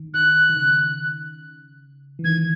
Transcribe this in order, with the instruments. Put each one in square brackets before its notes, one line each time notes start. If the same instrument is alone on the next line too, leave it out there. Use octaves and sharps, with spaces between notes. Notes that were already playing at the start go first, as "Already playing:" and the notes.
Already playing: [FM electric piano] D#3
[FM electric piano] D#3 [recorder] F#6
[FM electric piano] D#3
C#3
E3
[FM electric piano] D#3 [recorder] G#6